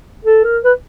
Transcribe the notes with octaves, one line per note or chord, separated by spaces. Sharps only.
A4
A#4
B4